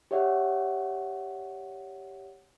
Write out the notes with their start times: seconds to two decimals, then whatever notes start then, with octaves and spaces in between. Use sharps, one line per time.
0.11 G4 C#5 D5 E5 F#5